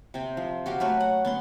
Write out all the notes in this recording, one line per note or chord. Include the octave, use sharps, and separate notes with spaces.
C3 C4
F3
F#4 G4 A#4 F5
F#3 A3 A#4 B4
F#5
B3 C#4 C6